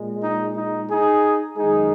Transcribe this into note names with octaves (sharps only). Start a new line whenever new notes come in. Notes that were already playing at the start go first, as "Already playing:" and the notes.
Already playing: A#2 G#3
D#4
D#4
D#4 G#4
F#2 D#3 G#3 D#4 G#4